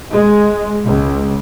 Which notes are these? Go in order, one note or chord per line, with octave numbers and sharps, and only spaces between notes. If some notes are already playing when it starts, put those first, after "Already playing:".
G#3
C#2